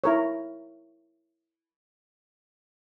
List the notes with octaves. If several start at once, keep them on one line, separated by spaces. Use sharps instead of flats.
E4 A#4 C#5